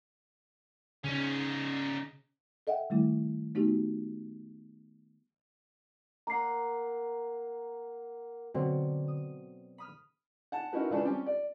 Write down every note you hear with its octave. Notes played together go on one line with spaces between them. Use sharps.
C#3 C#4 D#4
A4 D#5 E5 F#5 G5
D#3 G3 A3 E4
A3 B3 D#4 F#4 G4
A#3 F#5 A#5 C7
B2 D3 F#3 C4
D#6
B5 D#6 F6
F#5 G#5 A5
C#4 D#4 E4 F#4 A#4 B4
C#2 C#3 E3 D4 B4 A5
G3 C4 C#4 G4
D5